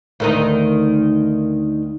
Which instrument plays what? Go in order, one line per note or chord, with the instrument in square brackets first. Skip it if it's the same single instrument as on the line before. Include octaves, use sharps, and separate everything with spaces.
[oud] D2 D#3 D#4